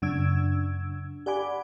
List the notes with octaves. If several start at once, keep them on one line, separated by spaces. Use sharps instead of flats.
F#2 C#3 D4 E6 G#6
G4 D5 F#5 G#5 B5 D6